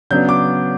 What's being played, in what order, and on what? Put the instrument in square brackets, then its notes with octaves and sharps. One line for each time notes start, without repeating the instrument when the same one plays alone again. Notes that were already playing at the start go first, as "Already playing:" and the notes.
[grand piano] C#3 F#3 B3 D4 G6
D6